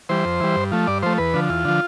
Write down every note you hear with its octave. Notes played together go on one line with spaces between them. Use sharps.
E3 G3 C5
F2
E3 G3
G2
F3 A3
G2 D5
F3 A3 C5
E2 B4
D3 F3
E2 F4
D3 F3